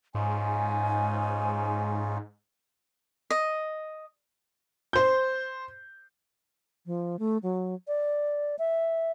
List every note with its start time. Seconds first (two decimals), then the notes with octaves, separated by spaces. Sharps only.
0.15 G#2 C#4 D#4 F4 G#5
3.30 D#5
4.93 C5 G6
6.86 F3
7.19 A3
7.43 F#3
7.88 D5
8.59 E5